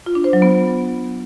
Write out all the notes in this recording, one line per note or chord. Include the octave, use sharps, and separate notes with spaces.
F4
D4
C5
F#3
B3